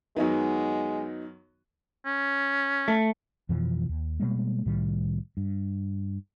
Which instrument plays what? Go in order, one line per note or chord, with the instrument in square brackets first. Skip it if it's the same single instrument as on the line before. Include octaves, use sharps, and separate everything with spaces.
[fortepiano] F#2 D#3 [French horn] G#3 [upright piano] B3 D#4 F#4
[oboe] C#4
[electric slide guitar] A3
[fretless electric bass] F2 B2 E3 F3
D#2
B2 G3 G#3 A#3
C2 A2 D#3 G3
G2